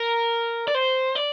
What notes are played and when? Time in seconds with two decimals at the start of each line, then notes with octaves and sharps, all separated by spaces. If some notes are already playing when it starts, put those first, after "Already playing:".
Already playing: A#4
0.68 D5
0.75 C5
1.16 D5